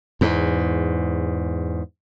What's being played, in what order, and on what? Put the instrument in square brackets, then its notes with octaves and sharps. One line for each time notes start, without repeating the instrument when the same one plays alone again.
[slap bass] E2 G#2